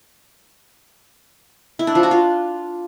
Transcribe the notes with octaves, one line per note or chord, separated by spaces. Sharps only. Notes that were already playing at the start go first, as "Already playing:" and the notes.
E4
D4
F3
F#4
F4